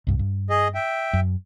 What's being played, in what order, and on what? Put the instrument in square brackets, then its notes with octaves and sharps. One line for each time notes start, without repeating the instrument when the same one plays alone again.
[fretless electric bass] C2 G2
G2
[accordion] G#4 D#5
E5 G5
[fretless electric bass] F#2